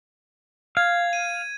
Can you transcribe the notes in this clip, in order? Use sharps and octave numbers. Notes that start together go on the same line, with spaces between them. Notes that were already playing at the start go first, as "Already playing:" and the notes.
F5 G#6
D#7